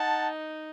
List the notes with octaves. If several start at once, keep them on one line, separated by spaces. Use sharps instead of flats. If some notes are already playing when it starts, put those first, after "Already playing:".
Already playing: D#4 F#5 A5